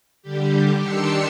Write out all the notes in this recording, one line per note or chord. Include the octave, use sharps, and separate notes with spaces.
D3 G3 G4
D#3 D4 G4 C6 E6 C#7